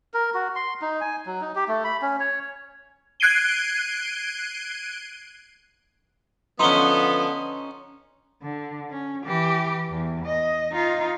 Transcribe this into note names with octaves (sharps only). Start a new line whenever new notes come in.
A#4
F#4
C6
D#4
G#5
F#3
D#4
G4
A3
B5
C#4
C#5
F#6 G#6 C7 D7 D#7 G7
D3 F3 B3 C#4 D#4 C6 G7
D3
C#4
E3 G4
E2
D#5
D#4 F4